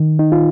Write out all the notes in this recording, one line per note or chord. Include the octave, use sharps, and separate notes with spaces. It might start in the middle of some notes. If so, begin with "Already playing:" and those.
Already playing: D#3
D#4
F4